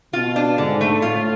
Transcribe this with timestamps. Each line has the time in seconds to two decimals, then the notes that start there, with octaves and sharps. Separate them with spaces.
0.13 B2 F4
0.36 D4
0.58 G#2 D3
0.81 A3
1.02 A2 F4